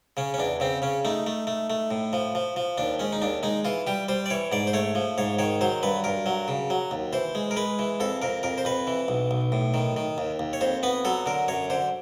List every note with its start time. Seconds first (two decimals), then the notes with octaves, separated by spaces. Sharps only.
0.17 C#3 C#4
0.34 C#4
0.38 E2 D4
0.60 C#3 C4
0.82 C#3 C#4
1.05 A3 D#4
1.27 A3
1.47 A3
1.70 A3
1.91 A2
2.13 F3
2.35 F3
2.56 F3
2.78 D#2 D4
2.99 G#3 C#4
3.13 D#4
3.22 D#2 D4
3.43 G#3 D#4
3.65 E3 F4
3.87 G3 G4
4.08 G3 C5
4.26 D5
4.30 E3 C#5
4.52 G#2 D5
4.67 C5
4.73 A3 C#5
4.95 F3
5.18 G#2 C#5
5.39 D#3 C#5
5.61 F#3 C5
5.83 G2 B4
6.04 G2 A#4
6.26 F#3
6.48 C#3
6.70 F#3
6.91 D#2
7.13 E3 C5
7.35 G#3
7.51 A#4
7.57 G#3 B4
7.79 E3
8.00 F2 A4
8.22 F2 A#4
8.43 F2 A#4
8.58 C5
8.65 F2 B4
8.87 E3
9.08 B1
9.31 B1
9.52 A2
9.74 D#3
9.97 D#3
10.18 D#2
10.39 D#2
10.53 C#5
10.61 F2 C5
10.83 B3 B4
11.05 F#3 A4
11.26 D3 A#4
11.48 F#2 C#5
11.70 D3 C5